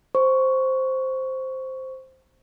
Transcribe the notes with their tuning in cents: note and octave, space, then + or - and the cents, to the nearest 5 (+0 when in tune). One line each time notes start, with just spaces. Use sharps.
C5 +0 C#6 +10